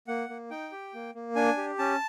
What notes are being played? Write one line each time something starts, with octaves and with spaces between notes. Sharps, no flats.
A#3 F#5
A#3
D#4 G5
G4
A#3
A#3
D4 G#5
G4
C#4 A5